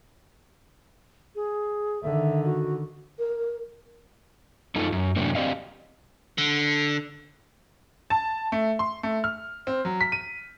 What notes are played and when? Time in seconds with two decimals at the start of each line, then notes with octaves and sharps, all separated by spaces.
1.35 G#4
2.03 D3 D#3 E5
2.45 F#4
3.19 A#4
4.75 F#2 D#4 F4 A4
4.92 F#2
5.16 F#2 A2 C3 F#3 A#3 D4
5.35 C4 G4 D5 D#5 F5
6.38 D3
8.10 A5
8.52 A3
8.79 C6
9.03 A3
9.24 F6
9.67 C4
9.85 F#3
10.01 B6
10.12 D#7